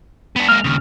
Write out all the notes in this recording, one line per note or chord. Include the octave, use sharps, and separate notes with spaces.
B3 D4
G#3 A#3 F6
D#2 C#3